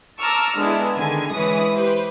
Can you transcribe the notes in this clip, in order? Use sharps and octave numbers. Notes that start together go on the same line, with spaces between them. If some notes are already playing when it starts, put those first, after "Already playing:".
A5 A#5 C#6 D6 E6 F6
D3 G#3 B3 D4 E4
D3 D#3 G#5
E3 G#3 C#4 B4 D#6
G4 B4 C5